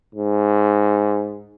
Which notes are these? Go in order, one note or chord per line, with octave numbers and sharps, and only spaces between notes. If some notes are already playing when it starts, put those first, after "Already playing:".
G#2